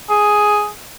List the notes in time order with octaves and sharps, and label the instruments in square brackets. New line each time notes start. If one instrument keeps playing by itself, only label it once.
[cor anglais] G#4